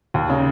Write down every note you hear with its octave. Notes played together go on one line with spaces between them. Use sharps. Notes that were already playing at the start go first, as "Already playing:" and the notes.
D#2
C#3